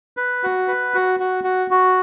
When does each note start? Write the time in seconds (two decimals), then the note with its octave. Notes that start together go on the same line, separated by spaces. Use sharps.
0.17 B4
0.43 F#4
0.68 B4
0.94 F#4
1.20 F#4
1.44 F#4
1.71 F#4